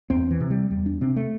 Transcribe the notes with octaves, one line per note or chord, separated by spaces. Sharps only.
E2 C4
E3
C3
G3
E2 G3
D4
C3 C4
A3